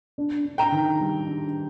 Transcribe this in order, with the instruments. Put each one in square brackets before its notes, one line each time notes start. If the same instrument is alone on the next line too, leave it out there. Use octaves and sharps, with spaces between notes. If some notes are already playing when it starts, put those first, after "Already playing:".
[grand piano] D4
D4
[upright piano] G5 A#5
[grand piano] D#3
G3
D4